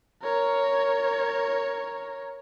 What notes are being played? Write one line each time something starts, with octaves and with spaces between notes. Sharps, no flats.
A#4 C#5